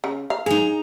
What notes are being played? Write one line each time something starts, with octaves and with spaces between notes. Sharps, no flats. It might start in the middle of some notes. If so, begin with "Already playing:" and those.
C#3
F5
D#4 G#4 A#5